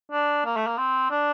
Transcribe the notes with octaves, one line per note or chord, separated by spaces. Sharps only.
D4
A#3
A3
A#3
C4
D4